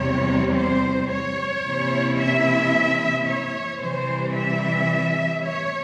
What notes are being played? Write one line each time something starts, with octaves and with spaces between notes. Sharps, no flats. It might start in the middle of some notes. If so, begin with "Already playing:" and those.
Already playing: E2 C3 E3 G3 C4 C#5
C5
C#5
C3 E3 A#3 C#4 E4
E5
C#5
C3 E3 G3 C5
E5
C#5